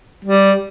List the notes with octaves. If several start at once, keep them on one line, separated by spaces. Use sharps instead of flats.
G3